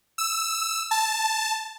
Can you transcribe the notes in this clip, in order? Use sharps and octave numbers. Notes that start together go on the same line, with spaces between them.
E6
A5